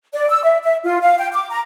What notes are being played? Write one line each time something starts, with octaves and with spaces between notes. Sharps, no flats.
D5
E6
E5
E5
F4
F5
G5
D6
A#5